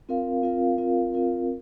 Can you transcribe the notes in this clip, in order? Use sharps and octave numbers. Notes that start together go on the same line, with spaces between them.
C4 F4 A#4 F5
C4 F4 A#4 F5
C4 F4 A#4 F5
C4 F4 A#4 F5